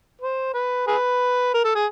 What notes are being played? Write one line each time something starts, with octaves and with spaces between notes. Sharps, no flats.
C5
B4
G#4 B4
A#4
A4
G#4